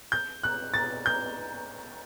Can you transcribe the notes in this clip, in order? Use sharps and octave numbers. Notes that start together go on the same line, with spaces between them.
G6
F#6
A6
G6